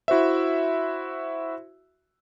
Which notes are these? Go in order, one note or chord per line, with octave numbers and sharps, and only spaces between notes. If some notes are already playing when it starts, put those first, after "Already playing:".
E4 F#4 C5 E5